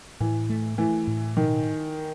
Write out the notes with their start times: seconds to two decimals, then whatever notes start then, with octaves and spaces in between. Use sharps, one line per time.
0.20 A2 E3
0.50 A3
0.78 E3 A3
1.07 A2
1.36 B2 D#3